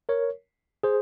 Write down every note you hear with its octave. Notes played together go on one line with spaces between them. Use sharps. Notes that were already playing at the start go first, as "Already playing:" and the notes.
A#4 C#5
G#4 C5